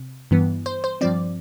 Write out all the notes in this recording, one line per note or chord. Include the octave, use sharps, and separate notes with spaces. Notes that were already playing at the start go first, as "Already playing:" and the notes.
Already playing: C3
G2 E3 B3
C5
C5
G2 F3 C4 D5